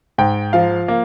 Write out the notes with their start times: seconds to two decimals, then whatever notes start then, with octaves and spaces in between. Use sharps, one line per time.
0.18 G#2 G5
0.53 F3 F5
0.88 A#3